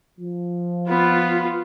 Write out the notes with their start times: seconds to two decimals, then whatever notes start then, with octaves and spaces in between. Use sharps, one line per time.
0.19 F3
0.88 B3 F4 B4